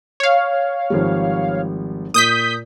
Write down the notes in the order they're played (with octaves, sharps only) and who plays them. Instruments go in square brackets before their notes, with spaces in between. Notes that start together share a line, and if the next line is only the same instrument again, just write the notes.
[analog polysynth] C#5 F5
[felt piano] G#1 F3 G3
[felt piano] A#2 [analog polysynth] D#6 G6 B6